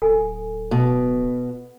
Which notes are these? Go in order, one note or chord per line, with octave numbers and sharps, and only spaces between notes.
D1 A4 G#5
B2